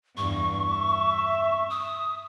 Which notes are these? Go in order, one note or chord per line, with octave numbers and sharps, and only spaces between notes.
E2 G2 C#6
E5
D#6